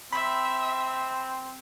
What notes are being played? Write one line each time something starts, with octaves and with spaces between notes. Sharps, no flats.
C4 E5 B5